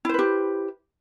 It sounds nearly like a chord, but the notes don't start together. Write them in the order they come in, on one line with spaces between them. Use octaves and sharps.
E4 C5 B4 G4